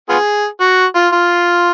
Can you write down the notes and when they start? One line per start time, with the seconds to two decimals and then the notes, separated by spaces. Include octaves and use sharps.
0.09 B3 F4 G#4
0.60 F#4
0.95 F4
1.12 F4